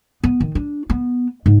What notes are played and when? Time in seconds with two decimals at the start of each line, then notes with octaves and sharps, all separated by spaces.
0.23 B3
0.40 D#3
0.55 D4
0.90 B3
1.46 G#2